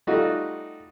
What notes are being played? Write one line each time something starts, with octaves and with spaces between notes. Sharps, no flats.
G3 A3 D#4 F4 F#4